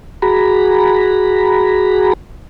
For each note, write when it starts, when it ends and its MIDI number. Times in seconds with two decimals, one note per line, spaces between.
0.22 2.13 66
0.22 2.13 68
0.22 2.13 82
0.22 2.13 83